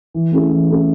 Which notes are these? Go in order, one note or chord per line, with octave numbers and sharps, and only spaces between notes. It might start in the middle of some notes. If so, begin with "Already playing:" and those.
E3
A3 C#4 E4 G#4
E3
A3 C#4 E4 G#4